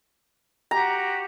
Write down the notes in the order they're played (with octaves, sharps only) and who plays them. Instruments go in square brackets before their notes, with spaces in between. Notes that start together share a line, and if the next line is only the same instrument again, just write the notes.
[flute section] F#4 G4 [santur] A#5